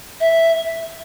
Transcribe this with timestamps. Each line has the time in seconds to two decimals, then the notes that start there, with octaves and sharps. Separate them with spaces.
0.20 E5